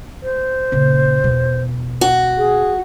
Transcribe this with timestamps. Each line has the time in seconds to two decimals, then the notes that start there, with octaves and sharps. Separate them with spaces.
0.23 C5
0.72 A#2 C#3
1.24 E2 B2
2.01 F#4
2.37 G#4